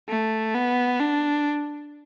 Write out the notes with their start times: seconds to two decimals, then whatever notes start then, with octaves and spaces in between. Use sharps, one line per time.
0.09 A3
0.55 B3
1.00 D4